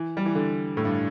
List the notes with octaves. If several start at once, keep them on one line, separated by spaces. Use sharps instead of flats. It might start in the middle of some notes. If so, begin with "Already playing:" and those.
Already playing: E3
G3
E3
D3
A2
G2